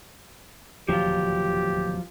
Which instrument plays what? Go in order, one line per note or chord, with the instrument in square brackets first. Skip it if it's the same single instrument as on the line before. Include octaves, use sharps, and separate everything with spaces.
[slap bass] D1 D#2 B2 [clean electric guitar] F3 F#3 F4 [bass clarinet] G4